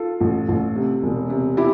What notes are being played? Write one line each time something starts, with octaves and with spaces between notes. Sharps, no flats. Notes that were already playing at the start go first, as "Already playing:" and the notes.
Already playing: F4 A4
A1
A1
C3
E1
C3
E4 G4